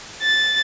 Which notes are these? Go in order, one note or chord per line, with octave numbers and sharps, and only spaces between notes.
A6